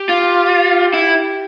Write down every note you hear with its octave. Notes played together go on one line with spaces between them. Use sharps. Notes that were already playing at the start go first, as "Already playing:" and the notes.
Already playing: G4
F4
E4